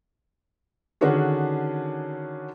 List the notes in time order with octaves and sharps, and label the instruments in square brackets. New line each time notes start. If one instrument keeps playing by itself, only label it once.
[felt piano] D3 D#3 C#4 D4 F#4 G#4